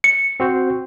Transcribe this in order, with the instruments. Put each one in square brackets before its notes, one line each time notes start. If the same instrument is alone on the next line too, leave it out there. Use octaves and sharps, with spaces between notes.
[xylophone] C#7
[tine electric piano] C4 F#4 C5